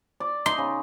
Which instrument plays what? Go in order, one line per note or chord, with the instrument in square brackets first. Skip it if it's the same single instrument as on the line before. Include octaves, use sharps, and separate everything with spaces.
[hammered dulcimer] D5
[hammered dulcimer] D#4 [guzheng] C6
[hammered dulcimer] C#3